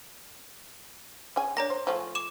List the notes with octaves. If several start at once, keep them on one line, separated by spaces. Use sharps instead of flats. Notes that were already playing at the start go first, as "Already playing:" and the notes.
C#4 G#4 G#5
A#3 D4 C#5 A#5 A#6
C5
F3 A3 G#4
D6 E7